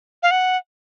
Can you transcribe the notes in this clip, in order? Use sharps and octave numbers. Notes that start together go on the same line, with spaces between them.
F5
F#5